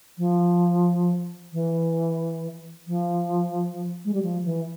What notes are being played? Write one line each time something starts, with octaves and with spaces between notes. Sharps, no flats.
F3
E3
F3
G#3
G3
F3
E3